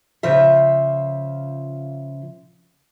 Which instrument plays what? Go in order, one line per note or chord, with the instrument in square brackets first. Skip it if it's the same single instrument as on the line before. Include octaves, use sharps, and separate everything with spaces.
[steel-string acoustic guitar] C#3 F3 F4 E5